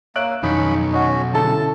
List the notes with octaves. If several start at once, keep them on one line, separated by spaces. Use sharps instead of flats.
A#3 C#5 E5 E6 F#6 D7 F#7
B1 F2 D#3 C#4 D#4 B5 C#7
C#4 F#4 D#5 F#5
D3 C#4 E4 A4 A5